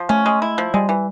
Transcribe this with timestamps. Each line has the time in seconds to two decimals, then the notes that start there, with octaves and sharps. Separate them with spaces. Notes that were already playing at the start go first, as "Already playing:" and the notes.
Already playing: F3
0.09 A3 C#4
0.26 G#3
0.42 E4
0.58 F3
0.74 G3 G#3
0.89 E3